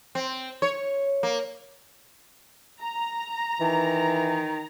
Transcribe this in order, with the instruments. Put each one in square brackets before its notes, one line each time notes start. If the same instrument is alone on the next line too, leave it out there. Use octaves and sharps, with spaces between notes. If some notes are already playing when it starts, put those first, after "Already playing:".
[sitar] C4
C#5
A#3
[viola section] A#5
[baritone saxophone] D#3 [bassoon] E3